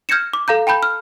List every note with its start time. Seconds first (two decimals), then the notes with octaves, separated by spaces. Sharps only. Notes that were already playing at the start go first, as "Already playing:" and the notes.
0.09 F6 G6 G#6 A#6 C#7 E7
0.33 D6
0.48 A4 F5 A#5 G6
0.67 G5 A5 B5 G6
0.83 F6